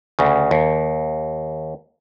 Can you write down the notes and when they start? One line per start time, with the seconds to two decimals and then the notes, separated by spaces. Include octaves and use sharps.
0.19 D2 C#3
0.51 D#2